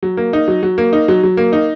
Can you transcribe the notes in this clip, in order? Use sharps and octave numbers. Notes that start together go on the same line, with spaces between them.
F#3
A#3
D#4
F#3
F#3
A#3
D#4
F#3
F#3
A#3
D#4